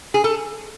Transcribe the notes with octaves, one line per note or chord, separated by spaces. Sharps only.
G#4
A4